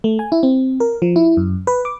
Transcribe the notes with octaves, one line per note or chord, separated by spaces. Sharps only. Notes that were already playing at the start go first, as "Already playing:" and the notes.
A3
G#5
E4
C4
A#4
F3
E4
F#2
B4
D6